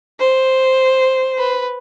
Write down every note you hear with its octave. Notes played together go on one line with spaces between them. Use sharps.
C5
B4